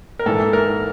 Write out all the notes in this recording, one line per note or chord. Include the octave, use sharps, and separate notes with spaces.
A#4
G#2 E3 A4
A#4